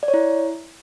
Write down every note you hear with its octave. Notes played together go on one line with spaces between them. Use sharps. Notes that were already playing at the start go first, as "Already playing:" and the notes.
D5
C#5
E4